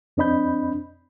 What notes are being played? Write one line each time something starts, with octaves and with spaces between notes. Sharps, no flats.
F2 C4 D4 D#5 B5 G6